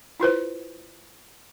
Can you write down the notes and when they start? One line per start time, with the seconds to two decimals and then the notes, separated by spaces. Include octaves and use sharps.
0.20 E4 F4 B4 C5